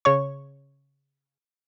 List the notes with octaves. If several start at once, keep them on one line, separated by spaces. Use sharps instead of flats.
C#3 C#5 C#6